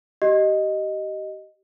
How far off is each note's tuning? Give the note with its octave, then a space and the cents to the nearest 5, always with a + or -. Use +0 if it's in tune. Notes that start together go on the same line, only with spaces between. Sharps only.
G4 -25 D#5 +0